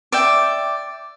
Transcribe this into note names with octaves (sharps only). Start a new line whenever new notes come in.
D5 E5 G5